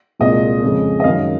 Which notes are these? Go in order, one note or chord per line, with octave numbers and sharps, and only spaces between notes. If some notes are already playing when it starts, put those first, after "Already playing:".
C2 A#2 G#3 D#5
F2 C#3 F3 G#3 C#4
D#5
F#2 D#3 G#3 F5